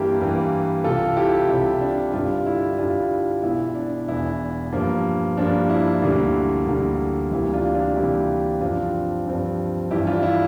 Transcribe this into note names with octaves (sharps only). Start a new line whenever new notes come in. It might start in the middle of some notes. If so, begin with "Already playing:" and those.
Already playing: G2 E3 A#3 E4 G4
G2 E3 A#3
C2 C3 G3 F4 A4
E4 G4
C2 C3 G3 E4
D4
G2 D3 G3 D4 F4
E4
G2 D3 G3 D4 F4
E1 E2 E3 E4
D4
E1 E2 E3 E4
G2 F3 A#3
G2 F3 A#3 D4
E4
D2 D3 G3 A#3
D2 D3 G3 A#3
D2 C3 E3 G3 A#3 E4
D4 F4
D4 F4
D2 C3 E3 G3 A#3 E4 G4
G2 F3 C4 D4 F4
G2 F3 C4
G2 E3 G3 E4 G4
D4 F4
E4